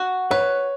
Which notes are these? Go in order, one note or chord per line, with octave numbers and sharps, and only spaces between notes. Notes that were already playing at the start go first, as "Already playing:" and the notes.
Already playing: F#4
B4 C#5